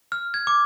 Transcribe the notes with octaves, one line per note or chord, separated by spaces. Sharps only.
F6
G#6
D6